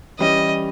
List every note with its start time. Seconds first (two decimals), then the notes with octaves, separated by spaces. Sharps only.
0.19 E3 G3 C#4 D#5